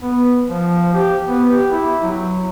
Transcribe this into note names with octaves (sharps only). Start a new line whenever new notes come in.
B3
F3
G4
B3
G4
E4
F#3